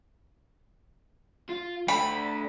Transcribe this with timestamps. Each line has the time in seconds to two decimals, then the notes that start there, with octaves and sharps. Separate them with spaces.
1.49 F4
1.88 A3 D4 B5